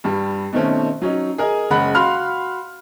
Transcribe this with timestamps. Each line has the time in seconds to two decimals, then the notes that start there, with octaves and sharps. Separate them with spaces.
0.04 G2 G3
0.53 B2 D#3 A3 C4 C#4
1.02 F#3 C#4 D#4
1.38 G#4 A#4 D#5 G#5
1.71 F#1 G#3 C#4 F#5 B5 F#6
1.95 F#4 F5 B5 C6 F6